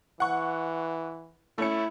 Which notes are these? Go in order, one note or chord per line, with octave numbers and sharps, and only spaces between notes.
E3 F#5 C#6
A3 C#4 E4 C#7